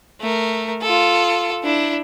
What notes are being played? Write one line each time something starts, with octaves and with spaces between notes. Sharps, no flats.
A3 A#4
F4 A4
D4 E4